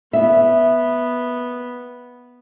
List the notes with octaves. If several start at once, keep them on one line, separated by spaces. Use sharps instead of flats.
B3 E5